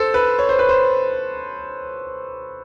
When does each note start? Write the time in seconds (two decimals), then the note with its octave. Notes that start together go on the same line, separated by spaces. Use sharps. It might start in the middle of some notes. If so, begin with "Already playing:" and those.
Already playing: A4 C5
0.14 B4
0.39 C#5
0.49 C5
0.59 B4
0.69 C5